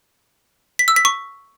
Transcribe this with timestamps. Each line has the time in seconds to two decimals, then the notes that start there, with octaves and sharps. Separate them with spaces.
0.79 B6
0.88 E6
0.96 B6
1.05 C#6